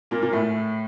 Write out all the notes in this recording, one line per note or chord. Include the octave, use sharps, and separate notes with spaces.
A#2 A#3
A#2 A#3
A2 A3